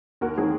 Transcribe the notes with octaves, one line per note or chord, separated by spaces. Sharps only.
D#2 F#4 A#4
D#3 F#3 C4 G#4